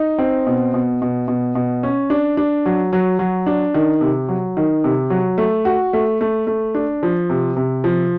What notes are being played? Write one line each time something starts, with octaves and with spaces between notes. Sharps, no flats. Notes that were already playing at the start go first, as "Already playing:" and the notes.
Already playing: D#4
C4
B2
B2
B2
B2
B2
C#4
D4
D4
F#3
F#3
F#3
D4
D#3
C3
F#3
D#3
C3
F#3
A3
F#4
A3
A3
A3
D4
F3
C3
C3
F3